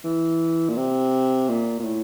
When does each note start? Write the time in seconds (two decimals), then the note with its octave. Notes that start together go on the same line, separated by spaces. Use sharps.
0.04 E3
0.69 A#2
0.77 C3
1.49 A#2
1.80 A#2
1.84 A2